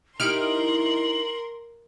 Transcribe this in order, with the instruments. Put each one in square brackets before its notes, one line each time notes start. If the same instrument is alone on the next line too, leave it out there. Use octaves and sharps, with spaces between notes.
[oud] D#4 E4 G4 [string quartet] A#4 C6 [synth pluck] F6 D7 [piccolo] F#7